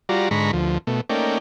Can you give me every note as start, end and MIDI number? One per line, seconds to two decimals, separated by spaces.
0.09 0.29 55
0.09 0.29 65
0.09 0.29 66
0.09 0.29 74
0.09 0.29 82
0.31 0.51 44
0.31 0.51 50
0.31 0.51 56
0.31 0.51 82
0.31 0.51 83
0.31 0.51 85
0.53 0.78 38
0.53 0.78 53
0.87 1.01 47
0.87 1.01 57
1.10 1.38 57
1.10 1.38 58
1.10 1.38 61
1.10 1.38 63
1.10 1.38 74
1.10 1.38 79